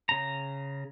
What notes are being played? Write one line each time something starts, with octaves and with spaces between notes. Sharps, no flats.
C#3 A#5